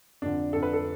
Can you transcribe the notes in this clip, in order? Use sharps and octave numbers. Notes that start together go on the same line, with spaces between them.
F1 F2 D3 D4
F1 F2 D3 A4
B4
A4